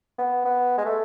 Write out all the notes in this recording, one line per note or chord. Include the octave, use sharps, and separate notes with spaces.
B3
B3
G#3
A3